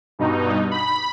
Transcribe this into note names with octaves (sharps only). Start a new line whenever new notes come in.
G2 B2 D#4
B5